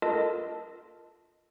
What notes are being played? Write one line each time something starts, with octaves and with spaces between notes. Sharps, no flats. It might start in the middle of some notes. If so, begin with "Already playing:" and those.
F4 A4 A#4 D#5 A5